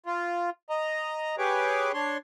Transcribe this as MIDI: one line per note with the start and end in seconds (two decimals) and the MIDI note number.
0.06 0.50 65
0.70 1.36 75
0.70 1.36 82
1.38 1.92 67
1.38 1.92 68
1.38 1.92 71
1.38 1.92 73
1.38 1.92 86
1.94 2.17 62
1.94 2.17 73
1.94 2.17 84